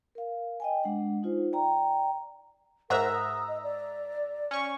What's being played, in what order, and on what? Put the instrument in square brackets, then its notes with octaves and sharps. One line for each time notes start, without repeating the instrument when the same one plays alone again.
[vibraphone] A#4 F5
D#5 G5 G#5
G#3 D4 F#5
D#4 F4 C5
D5 G5 A#5
[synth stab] G#2 E5 A#5 [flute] A#4 [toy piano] C5 F#5
[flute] D#6
D#5
D5
[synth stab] C#4 C#6